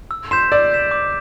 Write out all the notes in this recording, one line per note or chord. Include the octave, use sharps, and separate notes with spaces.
E6
C6 G6 B6 E7
D5 E6
G6 B6 E7
D6